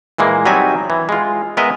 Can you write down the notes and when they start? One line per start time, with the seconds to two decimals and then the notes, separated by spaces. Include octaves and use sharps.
0.18 A#2 E3 G#3 A#3
0.46 F#3 G3 C4 D#4 E5 G#5
0.90 E3
1.09 G#3 F4
1.57 G#3 B3 A#4 B4 D#5 E5